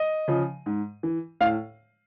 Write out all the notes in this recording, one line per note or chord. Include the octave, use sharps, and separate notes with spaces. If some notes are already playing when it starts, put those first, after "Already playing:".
Already playing: D#5
C#3 F3
G#2
E3
A2 F5